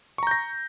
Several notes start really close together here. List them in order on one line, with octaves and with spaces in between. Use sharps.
C#6 A#5 G6 A#6